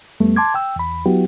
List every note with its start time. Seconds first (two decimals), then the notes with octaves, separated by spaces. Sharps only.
0.20 F2 G3 A3 B3
0.36 A5 C6 D6 G#6
0.54 G5 E6
0.76 E2 B5
1.06 F#3 B3 E4 F#4 G4